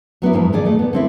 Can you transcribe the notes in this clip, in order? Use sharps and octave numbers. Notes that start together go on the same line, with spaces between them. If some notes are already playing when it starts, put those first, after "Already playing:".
F#3 B3 D4 E4
G#2 E3 F3
A#2 D#3 G#4 D5
A3 D5
B3
D3 C4 E4